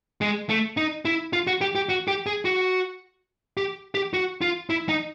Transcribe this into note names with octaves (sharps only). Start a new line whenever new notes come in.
G#3
A3
D#4
E4
F4
F#4
G4
G4
F#4
G4
G#4
F#4
G4
G4
F#4
F4
E4
D#4